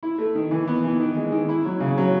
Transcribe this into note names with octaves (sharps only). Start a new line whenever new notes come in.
E4
A3
D#3
E3
B3
E3
D#3
G#3
D#3
E4
F#3
C#3
F#3